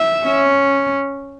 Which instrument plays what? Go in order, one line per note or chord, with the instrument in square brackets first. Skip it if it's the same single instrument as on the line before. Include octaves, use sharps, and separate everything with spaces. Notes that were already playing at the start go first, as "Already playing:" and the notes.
Already playing: [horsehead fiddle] E5
[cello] C#4